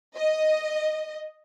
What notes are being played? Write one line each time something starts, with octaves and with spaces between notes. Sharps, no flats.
D#5